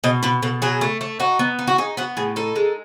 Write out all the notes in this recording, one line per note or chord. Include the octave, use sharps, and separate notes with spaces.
B2 D#5
B2 B4
B2 A4
F#3 G#4
A3
A3
D#4 F#4
B3
D#4
F#4
D#4 G#4
B3 F#4
A2 G#4
D#4 A4
G#3